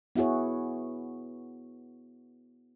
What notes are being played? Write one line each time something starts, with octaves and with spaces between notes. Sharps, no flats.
B3 E4 F#4 G#4 C#5